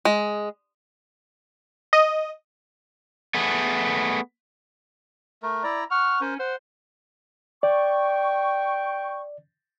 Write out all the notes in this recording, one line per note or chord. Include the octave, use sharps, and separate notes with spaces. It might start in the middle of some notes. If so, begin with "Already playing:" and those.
G#3
D#5
A3 B3 G#4
A3 A#4
E4 D5 A#5
F#5 C#6 F6
C#4 A#4 C5
C5 F#5
D5 G5 C#6